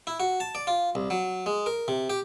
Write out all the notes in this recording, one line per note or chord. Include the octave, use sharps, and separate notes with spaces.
E4
F#4
A5
D5
F4
C2
F#3
G#3
A#4
C3
G4